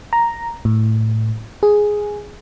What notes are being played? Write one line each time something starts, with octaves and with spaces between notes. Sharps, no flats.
A#5
A2
G#4